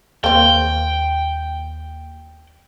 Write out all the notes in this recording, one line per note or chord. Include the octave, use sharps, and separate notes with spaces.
D#2 A#3 C4 G5